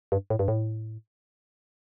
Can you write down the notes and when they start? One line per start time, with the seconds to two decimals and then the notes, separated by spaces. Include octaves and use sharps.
0.12 G2
0.30 A2
0.39 G2
0.48 A2